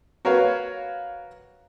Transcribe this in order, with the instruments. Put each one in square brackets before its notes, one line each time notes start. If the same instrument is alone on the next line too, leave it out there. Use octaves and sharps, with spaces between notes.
[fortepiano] F#4 A#4 B4 C#5 F5